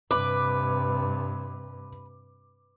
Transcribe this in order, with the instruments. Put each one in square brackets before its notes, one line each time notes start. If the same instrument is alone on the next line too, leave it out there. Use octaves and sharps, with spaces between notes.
[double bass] G2 C3 [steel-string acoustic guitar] B4 [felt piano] D6